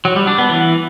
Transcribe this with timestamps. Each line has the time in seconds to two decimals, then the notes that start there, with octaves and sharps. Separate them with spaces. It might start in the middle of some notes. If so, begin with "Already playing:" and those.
0.05 F#3
0.16 G3
0.27 D4
0.38 B3
0.50 E3